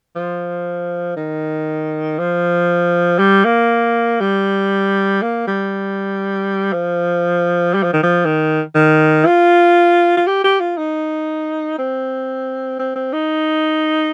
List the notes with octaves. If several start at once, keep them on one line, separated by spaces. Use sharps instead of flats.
F3
D#3
F3
G3
A#3
G3
A#3
G3
F3
G3
F3
D#3
F3
D#3
D#3
F4
F4
G4
G4
F4
D#4
C4
C4
C4
D#4